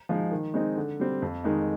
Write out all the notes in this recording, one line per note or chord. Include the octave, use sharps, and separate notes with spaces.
F3 G#3 D#4
D#3
G#3 C4 D#4
D3
G3 C4
F2
D#3 G#3 D#4